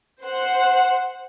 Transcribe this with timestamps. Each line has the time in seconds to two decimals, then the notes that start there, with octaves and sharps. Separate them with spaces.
0.23 C5 F#5